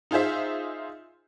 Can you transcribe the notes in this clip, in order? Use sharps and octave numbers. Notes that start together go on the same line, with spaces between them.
D#4 F4 G#4 C5 E5